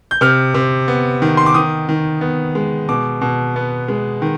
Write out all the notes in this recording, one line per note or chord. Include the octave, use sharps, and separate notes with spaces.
G6
C3 F6
C3
B3
D#3
C6
D6
D#3 D#6
D#3
B3
G#3
B2 D6
B2
B3
G#3
D#3